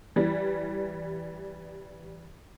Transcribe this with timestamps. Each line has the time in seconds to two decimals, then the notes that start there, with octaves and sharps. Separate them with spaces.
0.16 E3 G3